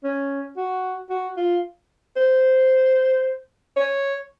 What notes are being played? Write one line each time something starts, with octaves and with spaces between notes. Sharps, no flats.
C#4
F#4
F#4
F4
C5
C#5